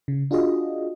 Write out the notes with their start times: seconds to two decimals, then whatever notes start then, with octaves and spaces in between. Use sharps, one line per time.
0.08 C#3
0.31 D4 F4 F#4 G#4 D#5